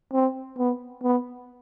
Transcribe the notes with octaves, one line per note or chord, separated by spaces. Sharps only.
C4
B3
B3